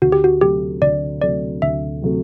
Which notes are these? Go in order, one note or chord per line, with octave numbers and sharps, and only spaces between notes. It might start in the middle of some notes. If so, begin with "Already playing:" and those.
D2 F#4
G4
F#4
C3 F#3 A3 G4
D2 D5
C3 F#3 A3 D5
D2 E5
C3 F#3 A3